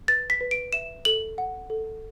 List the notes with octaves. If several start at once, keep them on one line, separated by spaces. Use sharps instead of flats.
B4 A6
B6
B4
D7
E5 E7
A4 F#7
F#5
A4